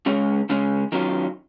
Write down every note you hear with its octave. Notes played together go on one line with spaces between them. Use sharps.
C#2 C#3 G#3 C#4
C#2 C#3 G#3 C#4
D#3 F#3 C#4 F4